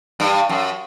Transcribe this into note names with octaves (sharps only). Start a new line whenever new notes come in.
G2
F#2